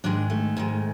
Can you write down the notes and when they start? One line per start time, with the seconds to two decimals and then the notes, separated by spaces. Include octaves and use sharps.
0.04 G#2 D#3 G#3 D4
0.30 A3
0.57 G#2 D#3 G#3